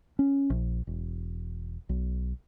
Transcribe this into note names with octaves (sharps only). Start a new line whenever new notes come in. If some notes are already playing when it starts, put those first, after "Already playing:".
C#4
A#1
E1
B1